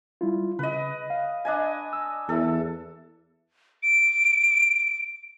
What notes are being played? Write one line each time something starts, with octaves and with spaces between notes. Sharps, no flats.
G3 E4 F4
C#3 B4 D#5
F5
D4 D#5 G#5
E6
E2 A4 E5
D7